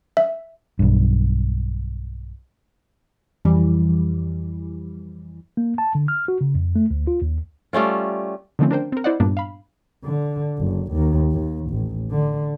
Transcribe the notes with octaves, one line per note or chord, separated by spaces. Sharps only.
E5
B1 G2
F2 E3 G3
A#3
A5
D3
F6
F#4
C#3
F2
A3
D2
F4
D#2
G3 A3 C#4 F4
D3 D#3 F3 A3 C4 C#4
D4 A#4 C5 G5
C4 A#4
E4 C5 D5 D#5 F#5
G2 A#2 G3 A#3 B3 D4
F5 B5
D3
F#1
D#2
D#2
A1
D3